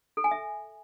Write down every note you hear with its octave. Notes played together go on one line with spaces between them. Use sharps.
A4
G#5
E5